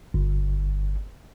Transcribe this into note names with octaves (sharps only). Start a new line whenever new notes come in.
G1